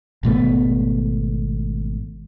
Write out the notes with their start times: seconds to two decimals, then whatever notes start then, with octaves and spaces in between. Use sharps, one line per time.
0.23 G#1 B2 A3 B3